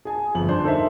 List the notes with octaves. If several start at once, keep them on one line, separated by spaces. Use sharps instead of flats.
G#4 G#5 A5
G1 F2 F#7
D4 C5
D#4 A4 A#4 C5 D#5 E5